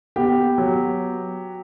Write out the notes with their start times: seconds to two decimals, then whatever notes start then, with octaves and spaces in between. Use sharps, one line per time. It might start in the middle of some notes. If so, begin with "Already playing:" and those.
0.16 B3 G4
0.58 F#3